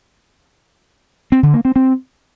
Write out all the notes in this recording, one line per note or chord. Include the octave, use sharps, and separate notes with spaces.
C4
D3
A#3
C4
C4